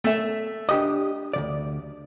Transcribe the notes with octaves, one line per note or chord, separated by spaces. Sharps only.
A3 E5
D4 G4 D#5 D#6
D2 C#3 D5